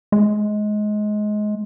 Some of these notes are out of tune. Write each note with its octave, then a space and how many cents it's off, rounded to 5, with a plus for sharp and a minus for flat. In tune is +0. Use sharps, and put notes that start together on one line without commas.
G#3 +20